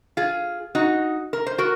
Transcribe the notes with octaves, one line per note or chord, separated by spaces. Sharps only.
F4 G#4
D#4 F#4
A#4
C5
F#4 A#4